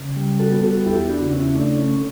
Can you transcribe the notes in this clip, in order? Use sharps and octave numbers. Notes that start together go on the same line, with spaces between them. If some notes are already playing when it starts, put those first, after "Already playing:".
Already playing: C#3
G3
F#4 A4
B3
F#4 A4
E2 E4 G4
D4 F#4
C#3
C#4 E4
A3 D4
C#4